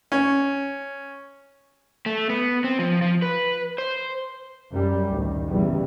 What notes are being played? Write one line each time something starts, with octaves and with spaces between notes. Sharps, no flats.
C#4
A3
B3
C4
F3
F3
B4
C5
F#2 G3
A1 D2 D#3
F#1 E2 B2 G3